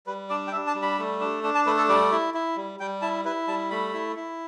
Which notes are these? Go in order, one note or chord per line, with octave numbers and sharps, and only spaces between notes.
G3 B4
D4 D5
G5
D4 E5
A5
G3
B5
A3
D4
D4
A5
A3 B4
A4
G3 D5
E4
E4
G3
G3 G5
E4 A5
E4 B4
G3 A5
A3 B5
E4
E4